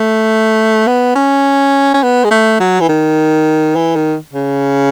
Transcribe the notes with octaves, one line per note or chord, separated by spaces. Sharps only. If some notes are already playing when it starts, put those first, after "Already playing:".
Already playing: A3
B3
C#4
C#4
B3
G#3
A3
F#3
E3
D#3
E3
D#3
C#3